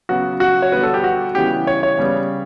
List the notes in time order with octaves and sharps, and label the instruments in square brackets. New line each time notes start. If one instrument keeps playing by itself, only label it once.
[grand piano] C#3 F#3 B3 F#4
F#4
C#5
D3 G3 B3 B4
A4
G4
F#4
C#3 E3 G3 B3 G4
C#5
C#5
C#3 G3 B3